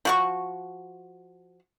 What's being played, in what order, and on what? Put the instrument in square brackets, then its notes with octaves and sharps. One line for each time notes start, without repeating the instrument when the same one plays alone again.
[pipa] F3 F#4 C#6